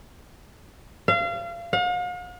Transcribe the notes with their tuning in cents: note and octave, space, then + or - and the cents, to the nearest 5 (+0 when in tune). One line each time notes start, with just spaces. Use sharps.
F5 -30
F5 +45